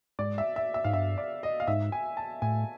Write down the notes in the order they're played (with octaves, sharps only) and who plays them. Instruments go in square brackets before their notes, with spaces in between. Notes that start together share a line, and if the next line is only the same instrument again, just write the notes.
[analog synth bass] G#2 [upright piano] D5
[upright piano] E5
E5
E5
[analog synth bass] G#2 [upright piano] F5
[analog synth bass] G2 [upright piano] E5
[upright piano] D5
D#5
F5
[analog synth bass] G#2 [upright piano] E5
[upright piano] G#5
A5
[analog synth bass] A2 [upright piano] G#5